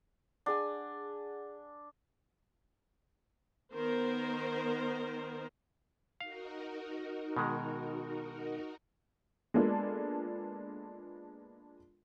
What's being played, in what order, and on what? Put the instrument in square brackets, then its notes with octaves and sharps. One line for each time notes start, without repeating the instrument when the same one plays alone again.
[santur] D4 G#5 [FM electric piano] G#4 F#5
[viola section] D#3 B3 A#4 C5
[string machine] D#4 F#4 A#4 [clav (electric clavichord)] F5
[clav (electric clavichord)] B2 D#3 G#3
[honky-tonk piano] G#3 A#3 B3 D4 F4 A4